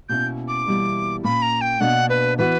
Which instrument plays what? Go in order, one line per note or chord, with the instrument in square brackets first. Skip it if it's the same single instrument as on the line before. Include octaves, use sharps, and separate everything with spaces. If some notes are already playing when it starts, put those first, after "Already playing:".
[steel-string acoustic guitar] B2 A#3 C#4 E4 [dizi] G6
[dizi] D6
[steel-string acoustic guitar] E2 B2 G3 A#3 E4
[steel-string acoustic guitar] A#2 A#3 C#4 [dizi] B5
[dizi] A#5
G5
[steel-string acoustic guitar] B2 A#3 D4 [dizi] F#5
[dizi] B4
[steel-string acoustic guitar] E3 B3 F#4 [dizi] B4